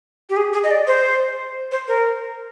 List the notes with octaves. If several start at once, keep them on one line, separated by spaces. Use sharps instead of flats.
G4
G#4
G#4
D#5
D5
C5
C5
A#4